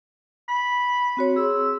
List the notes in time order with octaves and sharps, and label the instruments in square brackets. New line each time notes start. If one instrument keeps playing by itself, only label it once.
[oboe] B5
[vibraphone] C4 F#4 C#5
[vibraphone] G#4 C6 [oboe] E6